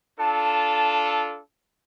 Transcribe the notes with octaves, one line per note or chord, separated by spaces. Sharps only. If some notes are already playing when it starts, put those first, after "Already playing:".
D4 F4 A4 A5